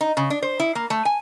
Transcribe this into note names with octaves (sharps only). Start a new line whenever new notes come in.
D#4
C#3
D4
C5
E4
A#3
A3
G#5